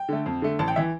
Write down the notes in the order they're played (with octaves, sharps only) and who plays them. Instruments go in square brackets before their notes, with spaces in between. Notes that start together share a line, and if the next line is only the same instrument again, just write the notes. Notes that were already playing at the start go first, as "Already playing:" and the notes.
Already playing: [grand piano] G5
D3 A3
F2
D3 A3
A1 A5
G5
E3 E5